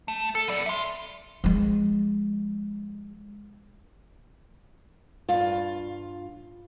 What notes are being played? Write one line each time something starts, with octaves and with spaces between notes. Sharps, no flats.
A3
A4
B3 D5
E5 C6
F3 G#3
G2 F4